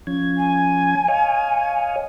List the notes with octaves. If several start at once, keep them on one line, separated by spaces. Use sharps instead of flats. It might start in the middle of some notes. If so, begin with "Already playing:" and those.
F3 C#4 G#6
G#5
C#5 D#5 F5